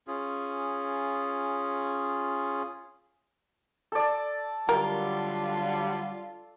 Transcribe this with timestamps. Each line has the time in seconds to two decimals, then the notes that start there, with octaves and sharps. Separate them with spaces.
0.07 C#4 F4 G#4
3.92 A4 D5
4.69 D3 F#3 G3 F4 A#4